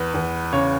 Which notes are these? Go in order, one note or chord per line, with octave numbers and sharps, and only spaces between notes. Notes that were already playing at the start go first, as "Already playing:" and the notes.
Already playing: E2 B4
E2
C#3 C#5